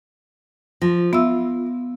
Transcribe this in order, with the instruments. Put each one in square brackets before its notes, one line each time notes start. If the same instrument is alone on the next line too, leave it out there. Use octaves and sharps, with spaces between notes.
[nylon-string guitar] F3 [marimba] A#6
[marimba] B3 E5 E6 [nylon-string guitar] F4